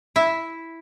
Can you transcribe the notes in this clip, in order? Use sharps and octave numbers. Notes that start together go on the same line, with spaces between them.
E4 E5